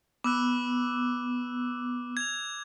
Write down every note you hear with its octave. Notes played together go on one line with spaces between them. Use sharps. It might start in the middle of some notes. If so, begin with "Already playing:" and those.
B3 D6 E6 F#6
G#6 F7